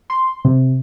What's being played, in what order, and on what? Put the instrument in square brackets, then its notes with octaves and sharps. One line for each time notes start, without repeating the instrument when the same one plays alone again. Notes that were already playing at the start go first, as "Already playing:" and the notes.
[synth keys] C6
C3